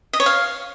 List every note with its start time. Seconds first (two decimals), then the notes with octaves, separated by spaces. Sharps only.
0.13 D#5
0.20 C#5
0.26 F5